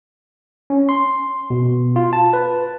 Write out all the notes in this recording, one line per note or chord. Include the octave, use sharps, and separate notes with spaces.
C#4
C6
B2
F4
A5
B4